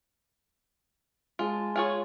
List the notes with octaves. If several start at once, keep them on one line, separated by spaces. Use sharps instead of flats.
G#3 F4 A5
F4 G#4 C#5